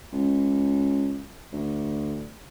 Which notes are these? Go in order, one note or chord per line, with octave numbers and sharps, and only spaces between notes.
C#2
D2